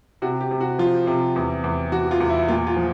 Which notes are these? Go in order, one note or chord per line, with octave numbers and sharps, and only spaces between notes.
C3 F#4
G4
C3
F#4
F3 F4
C3
E2
E2
E2 F#4
F4
E2
E4
A#2 F4
F4
F3